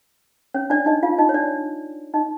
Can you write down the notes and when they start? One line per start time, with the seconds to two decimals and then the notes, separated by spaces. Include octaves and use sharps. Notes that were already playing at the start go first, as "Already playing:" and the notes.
0.54 C#4 C#5
0.70 D4 D5
0.86 D#4 D#5
1.03 F4 F5
1.18 D#4 D#5
1.29 C#5
1.34 D4 D5
2.14 D#4 D#5